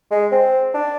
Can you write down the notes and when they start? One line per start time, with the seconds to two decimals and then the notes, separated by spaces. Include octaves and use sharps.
0.11 G#3
0.31 C4
0.74 D4